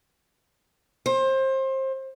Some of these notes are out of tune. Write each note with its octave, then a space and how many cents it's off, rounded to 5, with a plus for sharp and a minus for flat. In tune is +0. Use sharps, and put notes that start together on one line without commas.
C5 +25